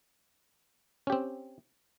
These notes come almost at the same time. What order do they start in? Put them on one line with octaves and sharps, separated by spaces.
C#4 G4 C4